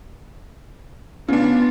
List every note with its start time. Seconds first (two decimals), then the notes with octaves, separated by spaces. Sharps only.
1.29 C#3 B3 D4 F4